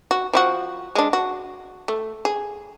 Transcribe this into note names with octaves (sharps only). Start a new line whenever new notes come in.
F#4
F3 E4 F#4
G#3 D4
F#4
A3
G#4